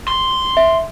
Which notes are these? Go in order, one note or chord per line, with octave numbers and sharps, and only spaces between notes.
C6
E5